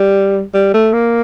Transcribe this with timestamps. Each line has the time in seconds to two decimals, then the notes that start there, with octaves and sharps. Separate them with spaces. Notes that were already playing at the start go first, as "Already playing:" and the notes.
Already playing: G3
0.54 G3
0.74 A3
0.93 A#3